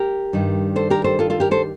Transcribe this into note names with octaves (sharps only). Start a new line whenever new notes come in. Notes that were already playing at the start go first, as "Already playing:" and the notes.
Already playing: G4 A#4
G2 D#3 G3
A4 C5
G4 A#4
A4 C5
F4 A4
F4 A4
G4 A#4
A4 C5